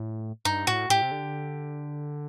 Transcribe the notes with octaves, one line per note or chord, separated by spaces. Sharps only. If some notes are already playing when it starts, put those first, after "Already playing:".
Already playing: A2
G2 D#4
A2 F#4
A2 G4
C3
D3